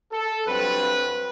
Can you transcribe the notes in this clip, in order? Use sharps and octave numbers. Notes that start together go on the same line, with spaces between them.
A4
G2 F#3 C4 B4